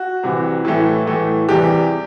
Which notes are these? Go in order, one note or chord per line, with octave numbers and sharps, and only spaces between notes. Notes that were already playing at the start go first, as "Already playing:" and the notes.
Already playing: F#4
C2 C3 E3
A2 E3 A3
A2 E3 A3
E2 C3 E3 G3 G4